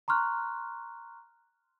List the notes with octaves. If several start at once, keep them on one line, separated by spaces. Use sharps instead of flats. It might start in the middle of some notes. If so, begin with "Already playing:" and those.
A#5 C6 C#6 F6 F#6